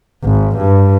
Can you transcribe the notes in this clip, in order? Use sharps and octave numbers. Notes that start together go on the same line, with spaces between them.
G#1
G2